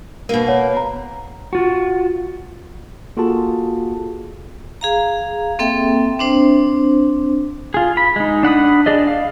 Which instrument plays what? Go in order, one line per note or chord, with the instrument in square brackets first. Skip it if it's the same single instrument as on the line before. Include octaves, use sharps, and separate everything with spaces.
[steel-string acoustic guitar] B2 A#3 [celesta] A#4
[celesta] C#5 F#5
A#5
[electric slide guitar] F4 F#4
[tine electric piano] A#3 F4 F#4 G#4 A4 A5
[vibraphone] G#4 F5 A#5
A#3 C4 A4 E5 G5
C4 D4 C5
[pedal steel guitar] F4 G#4
B5
G#3 D#4
D4 F#5 B5 D#6
D4 G#4 D5 D#5
F5